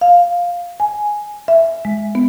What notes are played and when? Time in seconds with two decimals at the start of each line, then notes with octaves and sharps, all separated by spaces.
0.01 F5
0.80 G#5
1.48 E5
1.85 G#3
2.15 B3